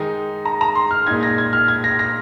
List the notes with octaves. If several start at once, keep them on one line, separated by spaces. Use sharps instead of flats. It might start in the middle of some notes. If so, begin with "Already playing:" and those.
Already playing: D#3 G#3 D#4
A#5
A#5
C6
F6
A#2 G#3 D#4 G#6
A#6
G#6
F6
G#6
A#6
A#6